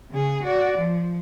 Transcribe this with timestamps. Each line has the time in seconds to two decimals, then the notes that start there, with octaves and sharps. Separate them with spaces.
0.11 C#3 G#4
0.44 F#4 D5
0.78 F3